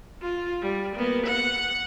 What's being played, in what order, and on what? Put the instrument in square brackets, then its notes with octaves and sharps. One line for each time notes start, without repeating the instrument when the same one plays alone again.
[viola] F4
G3
A#3 B3
F#5